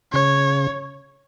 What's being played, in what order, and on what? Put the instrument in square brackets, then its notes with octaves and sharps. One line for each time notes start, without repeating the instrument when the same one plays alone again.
[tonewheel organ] C#3 [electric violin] C#5